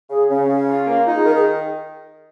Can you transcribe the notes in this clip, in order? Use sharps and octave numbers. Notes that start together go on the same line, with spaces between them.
C#3 G#4
C#3 C#4
C#3
F4
A#3
D#4 F4
G#4
D#3 A#4
G#4